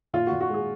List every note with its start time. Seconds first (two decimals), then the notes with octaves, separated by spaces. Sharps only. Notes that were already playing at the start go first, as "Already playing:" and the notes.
0.13 A#2 F4
0.27 F#4
0.32 A#2
0.40 F#4
0.49 G#3 G#4